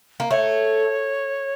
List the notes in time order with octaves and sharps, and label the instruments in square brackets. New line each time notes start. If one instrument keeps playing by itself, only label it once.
[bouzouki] A#3
[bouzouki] A3 [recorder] C#5